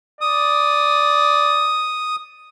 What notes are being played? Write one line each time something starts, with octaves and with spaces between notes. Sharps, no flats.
D5 D#6